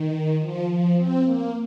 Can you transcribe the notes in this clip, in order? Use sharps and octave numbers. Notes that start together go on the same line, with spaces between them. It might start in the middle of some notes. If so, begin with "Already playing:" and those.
Already playing: D#3
F3
F3
C4
A#3